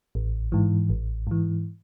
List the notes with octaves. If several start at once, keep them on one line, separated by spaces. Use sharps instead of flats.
A1
G#2 E3
A1
G#2 E3